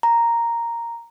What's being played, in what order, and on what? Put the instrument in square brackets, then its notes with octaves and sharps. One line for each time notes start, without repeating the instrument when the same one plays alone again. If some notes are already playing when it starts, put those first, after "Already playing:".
[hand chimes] A#5